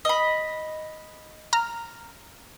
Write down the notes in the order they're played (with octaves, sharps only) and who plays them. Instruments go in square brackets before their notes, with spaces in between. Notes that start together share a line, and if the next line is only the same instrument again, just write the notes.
[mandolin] D#5 B5
[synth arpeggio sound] A#5 F6